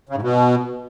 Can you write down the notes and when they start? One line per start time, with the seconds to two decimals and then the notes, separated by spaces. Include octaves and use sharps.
0.09 C#3
0.16 G#2
0.22 B2